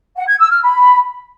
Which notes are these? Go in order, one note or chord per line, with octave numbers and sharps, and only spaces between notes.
F#5
G#6
E6
F6
B5